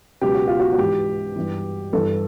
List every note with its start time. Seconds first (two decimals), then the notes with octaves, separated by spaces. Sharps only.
0.21 C#2 B2 F#3 G4
0.34 F#4
0.47 F4
0.60 F#4
0.73 F#4
0.78 G#2 E3 G4
1.36 G2 E3
1.93 G2 E3 A4